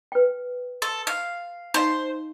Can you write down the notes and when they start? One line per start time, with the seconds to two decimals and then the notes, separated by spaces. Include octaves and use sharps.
0.12 B4 G5
0.82 A4 C6
1.07 F5
1.74 D#4 C5 D#5 F5